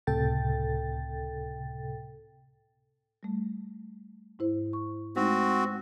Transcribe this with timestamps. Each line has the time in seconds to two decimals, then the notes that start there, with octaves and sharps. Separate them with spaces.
0.07 C#2 A2 C3 A4 G5 A6
3.23 G3 A3
4.39 G#2 E4 C5
4.73 C#6
5.16 G#3 A3 C4 D#4 F#4